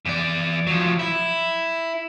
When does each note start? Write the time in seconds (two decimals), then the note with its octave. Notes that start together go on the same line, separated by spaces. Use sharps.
0.05 E2 D5
0.67 F3 F#3
0.99 E4